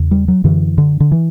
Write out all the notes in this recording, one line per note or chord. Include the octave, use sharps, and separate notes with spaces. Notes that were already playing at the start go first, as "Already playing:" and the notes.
Already playing: E2 C#3
G3
F#3
F#2 D3 E3
D3
D3
E3